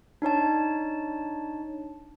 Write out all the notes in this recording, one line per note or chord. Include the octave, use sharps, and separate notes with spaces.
D4 D#4 C#5 A5